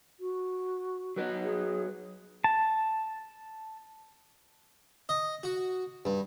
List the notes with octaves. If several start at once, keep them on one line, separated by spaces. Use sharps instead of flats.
F#4
F#3 B4 D#5
G#4
A5
D#5
F#4
G2